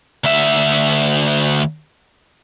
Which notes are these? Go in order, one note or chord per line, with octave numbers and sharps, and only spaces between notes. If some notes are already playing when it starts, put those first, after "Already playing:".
D2 E5